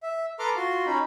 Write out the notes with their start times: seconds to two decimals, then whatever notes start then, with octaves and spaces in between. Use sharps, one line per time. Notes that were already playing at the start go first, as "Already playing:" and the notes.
0.03 E5
0.39 A4 B4 A#5 C6 D6 F6
0.56 F4 F#4 C6
0.86 C#4 D#4 B5